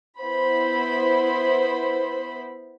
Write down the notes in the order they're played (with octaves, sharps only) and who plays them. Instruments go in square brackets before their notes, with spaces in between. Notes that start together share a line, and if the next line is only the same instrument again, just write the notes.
[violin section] B3 E4 C5 B5